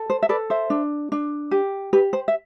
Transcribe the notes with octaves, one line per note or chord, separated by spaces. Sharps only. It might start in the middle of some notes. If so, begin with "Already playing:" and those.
Already playing: A4
C5
E5
A4 B4 D5
C5 E5
D4
D4
G4
G4 B4
C5
E5